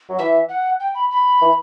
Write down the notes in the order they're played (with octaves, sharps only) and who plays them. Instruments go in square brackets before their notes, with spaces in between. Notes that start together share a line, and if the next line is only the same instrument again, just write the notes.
[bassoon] F#3
[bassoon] E3 [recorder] E5
[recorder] F#5
G5
B5
B5
[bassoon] E3